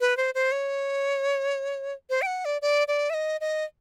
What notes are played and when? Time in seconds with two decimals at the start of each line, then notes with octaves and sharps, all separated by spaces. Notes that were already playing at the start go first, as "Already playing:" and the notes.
0.01 B4
0.17 C5
0.35 C5
0.52 C#5
2.10 C5
2.22 G5
2.26 F#5
2.45 D5
2.62 D5
2.88 D5
3.10 E5
3.14 D#5
3.41 D#5